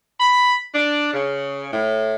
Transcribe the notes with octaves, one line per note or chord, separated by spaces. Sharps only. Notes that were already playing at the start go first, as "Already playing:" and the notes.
B5
D4
C#3
A2